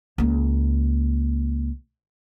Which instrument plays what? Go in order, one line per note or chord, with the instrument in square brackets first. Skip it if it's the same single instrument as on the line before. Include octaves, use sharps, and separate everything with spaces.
[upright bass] C#2 A#3